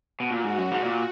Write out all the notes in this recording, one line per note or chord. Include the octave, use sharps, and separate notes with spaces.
B2
A#2 F#4
G#2
F#2
G#2
A#2